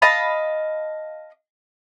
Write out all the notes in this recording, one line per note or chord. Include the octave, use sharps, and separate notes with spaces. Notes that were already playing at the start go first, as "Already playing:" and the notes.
D#5 F5 A5 B5